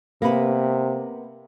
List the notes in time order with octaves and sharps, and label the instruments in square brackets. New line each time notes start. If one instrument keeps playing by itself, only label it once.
[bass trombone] C3 [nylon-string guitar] A#3 B3 B4